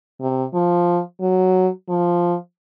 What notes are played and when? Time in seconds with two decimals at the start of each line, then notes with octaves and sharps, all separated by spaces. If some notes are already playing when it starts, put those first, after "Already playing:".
0.21 C3
0.54 F3
1.21 F#3
1.89 F3